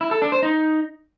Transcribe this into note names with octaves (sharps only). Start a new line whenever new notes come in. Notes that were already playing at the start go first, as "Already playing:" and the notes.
E4
A4
D4
C5
D#4